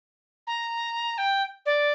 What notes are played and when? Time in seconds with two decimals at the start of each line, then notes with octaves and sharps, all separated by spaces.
0.47 A#5
1.17 G5
1.65 D5